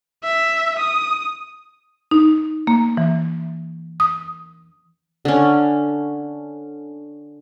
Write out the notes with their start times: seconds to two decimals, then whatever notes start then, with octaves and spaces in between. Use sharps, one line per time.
0.24 E5
0.79 D#6
2.11 D#4
2.67 A#3
2.97 E3
4.00 D#6
5.25 D3 C#4